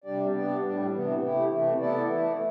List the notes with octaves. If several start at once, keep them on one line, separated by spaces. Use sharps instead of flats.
C3 G3 D4 G4 D5
B3 D4 G4 D5
A2 G3 D4
C3 E3 B3
A3 E4 G4
C3 E3 A3
B3 E4 A4 D5
E3 A3 E4